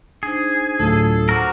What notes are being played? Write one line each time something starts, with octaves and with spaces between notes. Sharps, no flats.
D4 D#4 G#4 C5
D2 A2 F#3 D4 F4 A4 F5
F#4 A#4 C5 F#5 D6